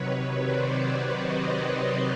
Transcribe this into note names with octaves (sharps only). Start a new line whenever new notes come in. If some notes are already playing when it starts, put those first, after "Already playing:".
Already playing: C3 D#3 F#3 B4 C#5
C5 D5
C#5 D#5
C5 D5